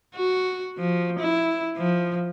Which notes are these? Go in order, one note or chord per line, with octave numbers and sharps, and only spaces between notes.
F#4
F3
E4
F3